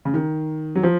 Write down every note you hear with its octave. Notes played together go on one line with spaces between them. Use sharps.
C#3
D#3
F#3
F3